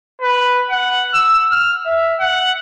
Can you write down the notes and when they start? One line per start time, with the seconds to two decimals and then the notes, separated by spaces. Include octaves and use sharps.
0.21 B4
0.70 F#5
1.14 E6
1.52 F6
1.86 E5
2.20 F#5